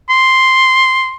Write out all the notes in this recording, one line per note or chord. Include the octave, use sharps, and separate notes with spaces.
C6